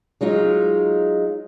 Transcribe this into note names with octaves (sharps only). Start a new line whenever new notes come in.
F#3 G#3 D#4 F4